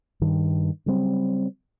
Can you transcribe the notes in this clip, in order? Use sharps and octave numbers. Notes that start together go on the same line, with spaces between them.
G2 D#3
C#3 F#3 G3 C4